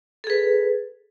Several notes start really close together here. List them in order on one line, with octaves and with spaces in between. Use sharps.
A4 G#4 B4